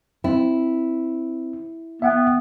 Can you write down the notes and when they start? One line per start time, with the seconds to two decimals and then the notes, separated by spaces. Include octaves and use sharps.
0.24 C4 E4
2.02 B3 E5 F#5 G5